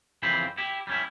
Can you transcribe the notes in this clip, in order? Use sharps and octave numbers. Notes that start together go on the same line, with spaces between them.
F2 C#3 E3 C4 C5 B5
E4 G4
G3 C#4 E4